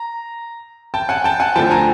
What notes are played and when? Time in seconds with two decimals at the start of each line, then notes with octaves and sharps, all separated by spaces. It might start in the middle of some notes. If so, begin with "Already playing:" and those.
Already playing: A#5
0.94 G5 A5
1.09 F#5 G#5
1.24 G5 A5
1.40 F#5 G#5
1.56 D2 D3 F3 G5 A5
1.71 G#5 A#5